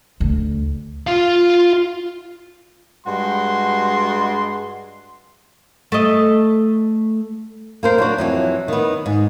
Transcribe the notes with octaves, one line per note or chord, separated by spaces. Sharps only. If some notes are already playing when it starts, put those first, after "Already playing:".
D2
F4 F5
G2 G#3 F#4 C6
A3 D#5
A#3 A#4 C5
F#3 D4 F#4
F2 E3 F#3
D#3 B3
G#2